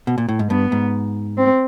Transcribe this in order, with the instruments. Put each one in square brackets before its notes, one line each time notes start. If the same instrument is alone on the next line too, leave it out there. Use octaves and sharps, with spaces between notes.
[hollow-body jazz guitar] B2
A#2
A2
G#2
[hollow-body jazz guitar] G2 [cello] B3
[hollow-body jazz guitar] G#2
[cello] C4